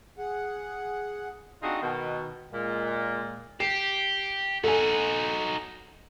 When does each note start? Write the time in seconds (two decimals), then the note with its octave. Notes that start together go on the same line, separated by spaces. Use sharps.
0.18 G#4 F#5
1.63 C4 D4 D#4 F4 F#4 G#4
1.82 B2 D#3
2.53 A#2 G#3
3.60 G4 C7 E7
4.64 D#4 F#4 A4 G#5